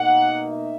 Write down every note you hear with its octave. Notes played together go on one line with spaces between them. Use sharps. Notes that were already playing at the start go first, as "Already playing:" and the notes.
Already playing: B2 A#3 D#4 F#5
E5